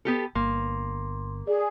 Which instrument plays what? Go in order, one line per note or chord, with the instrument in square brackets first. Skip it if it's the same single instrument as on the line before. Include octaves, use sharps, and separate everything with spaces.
[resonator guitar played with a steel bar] B3 G4 A4
[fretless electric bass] G1 [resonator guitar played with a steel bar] A#3 [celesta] C6
[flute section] G#4 [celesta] D5